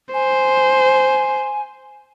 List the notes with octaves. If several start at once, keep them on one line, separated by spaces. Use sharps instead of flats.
C5 G#5